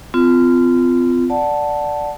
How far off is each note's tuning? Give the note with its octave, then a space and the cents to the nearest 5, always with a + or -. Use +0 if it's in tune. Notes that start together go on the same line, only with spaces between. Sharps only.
C4 -40 F4 -10
D5 +0 F#5 +0 A5 +0